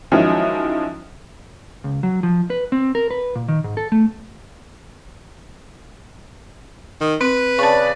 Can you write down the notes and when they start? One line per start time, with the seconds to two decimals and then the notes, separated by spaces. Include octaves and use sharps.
0.12 D#3 F3 F#3 G#3 C#4 E4
1.84 C#2
2.03 F#3
2.23 F3
2.50 B4
2.72 C4
2.95 A#4
3.11 B4
3.35 A#2
3.48 D#3
3.64 G#2
3.77 A4
3.92 A3
7.01 D#3
7.21 C4 B4
7.59 C#3 D5 A5 C#6